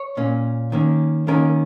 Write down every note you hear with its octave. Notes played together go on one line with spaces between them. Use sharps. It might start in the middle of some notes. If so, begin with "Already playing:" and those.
Already playing: C#5
A#2 A#3 C#4
D#3 A#3 C#4
D#3 A#3 C#4 A#4